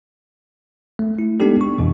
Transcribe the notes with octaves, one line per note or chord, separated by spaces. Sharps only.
A3
E4
G#3 B3 D4 D#4 G4 A4
C#6
F2 B2 E3